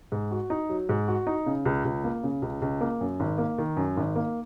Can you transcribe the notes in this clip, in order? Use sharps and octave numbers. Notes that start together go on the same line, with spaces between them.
G#2
F#4
D#4
F#3
G#2
F#4
D#4
C#3
C#2
C#2
A#3
C#3
C#2
C#2
A#3
F#2
G#1
A#3
D#3
F#2
G#1
A#3